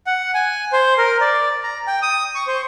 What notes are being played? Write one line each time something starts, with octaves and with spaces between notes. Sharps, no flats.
F#5
G#5
C5
A#4
D5
A#5
G5
D#6
C#6
C5